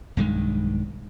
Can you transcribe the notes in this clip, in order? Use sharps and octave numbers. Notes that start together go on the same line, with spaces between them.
B1 G2 D#3 G#3